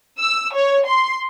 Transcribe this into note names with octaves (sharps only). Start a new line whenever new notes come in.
E6
C#5
C6